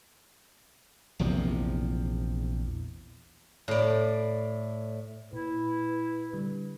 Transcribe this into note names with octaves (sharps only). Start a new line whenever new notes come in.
A#1 E2 C3 F3
A2 D5
A#2 E4 B4
D3 G3